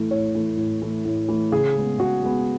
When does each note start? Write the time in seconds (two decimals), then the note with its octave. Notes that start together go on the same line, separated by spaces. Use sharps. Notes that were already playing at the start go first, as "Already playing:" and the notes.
Already playing: A2 E3 A3
0.11 A2 C#5
0.35 E3 A3
0.57 A2
0.82 E3 A3
1.05 A2
1.29 E3 A3
1.52 C#3 G#4
1.76 G#3 B3
1.98 C#3 F#4
2.22 G#3 B3